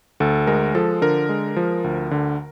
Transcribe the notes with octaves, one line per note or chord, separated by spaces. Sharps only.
D2 A4
G#3 A#4
F3 A4
D3 A#4
G#3
F3
D2
D3